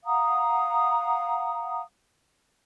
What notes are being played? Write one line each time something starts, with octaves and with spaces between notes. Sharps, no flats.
F5 F#5 A#5 D#6